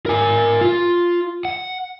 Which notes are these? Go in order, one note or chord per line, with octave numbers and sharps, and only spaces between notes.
A#4 G#5
F4
F#5